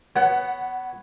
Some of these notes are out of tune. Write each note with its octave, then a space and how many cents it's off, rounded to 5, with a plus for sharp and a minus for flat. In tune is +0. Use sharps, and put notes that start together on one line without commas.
B3 +0 C#5 +0 F#5 +20